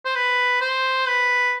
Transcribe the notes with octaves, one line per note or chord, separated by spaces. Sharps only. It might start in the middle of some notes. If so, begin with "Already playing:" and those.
C5
B4
C5
B4